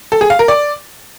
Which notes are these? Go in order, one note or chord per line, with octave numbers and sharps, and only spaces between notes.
A4
G#4
F5
A#4
D5